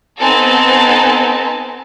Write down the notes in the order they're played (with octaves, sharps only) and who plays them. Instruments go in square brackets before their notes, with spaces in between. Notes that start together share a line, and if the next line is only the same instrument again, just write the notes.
[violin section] B3 C4 D#4 A4 G#5 A5